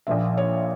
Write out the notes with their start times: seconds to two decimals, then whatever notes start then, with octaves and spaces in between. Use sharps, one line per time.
0.07 A#1 A#2 F3 E5
0.38 C#5